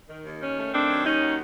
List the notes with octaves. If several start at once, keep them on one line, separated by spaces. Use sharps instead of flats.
D#3
D#2
D#3 C#4
A3
D#3 C4 D4
F#3
D#2 C#4 D#4
F#3